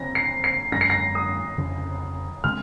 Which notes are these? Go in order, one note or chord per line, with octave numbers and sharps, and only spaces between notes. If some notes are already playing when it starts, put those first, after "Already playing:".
Already playing: C#3 F3 C4 A#6
C7
C7
F#2 F3 G#3 C#4 A#6
C7
A#6
D#6
F2 C#3 F3
C#3 G#3 C4 F6